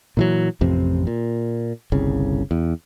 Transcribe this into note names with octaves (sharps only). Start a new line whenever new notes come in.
A#2 E3 F#3
A1 F2 C3 C4
A#2
G1 C2 C#3
E2